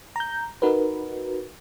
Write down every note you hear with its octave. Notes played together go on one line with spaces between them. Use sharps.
A#5 G6
D#4 F#4 A#4 B4